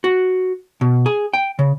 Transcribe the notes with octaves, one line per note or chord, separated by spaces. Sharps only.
F#4
B2
G#4
G5
C#3